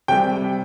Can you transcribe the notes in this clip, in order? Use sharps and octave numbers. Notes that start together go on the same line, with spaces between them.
C3 G3 G5